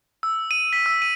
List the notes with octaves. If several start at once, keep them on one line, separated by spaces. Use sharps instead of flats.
E6
D#7
B6
E6
D#7